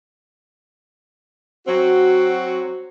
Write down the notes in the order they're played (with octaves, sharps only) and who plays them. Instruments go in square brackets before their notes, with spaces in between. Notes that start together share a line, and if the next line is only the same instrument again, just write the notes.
[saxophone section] F#3 C4 F#4